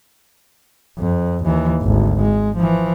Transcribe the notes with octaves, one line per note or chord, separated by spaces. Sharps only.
F2
D#2 E3
G#1 D2
G#3
E3 F3